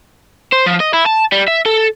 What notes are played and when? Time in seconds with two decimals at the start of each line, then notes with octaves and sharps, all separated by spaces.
0.53 C5
0.67 F3
0.80 D#5
0.94 E4
1.06 A5
1.32 G3
1.48 E5
1.66 A4